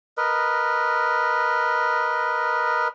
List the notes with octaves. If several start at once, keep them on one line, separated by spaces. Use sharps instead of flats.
A#4 B4 D#5